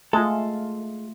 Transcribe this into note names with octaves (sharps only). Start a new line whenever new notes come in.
G#3 A3 F4 A4